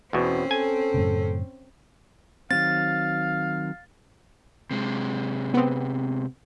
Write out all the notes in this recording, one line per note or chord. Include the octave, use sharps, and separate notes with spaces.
E2 B2 C4 C#4
A4 G#5
F#2 A2 C#3
D#3 F#3 C4 F5 A6
C3 G#3
B3 C4